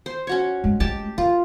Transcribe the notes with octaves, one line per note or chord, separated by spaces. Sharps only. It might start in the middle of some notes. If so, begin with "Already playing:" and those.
C5
C#4 F#4 C#5
G#3
G#3 A3 G4 A5
D#3 F4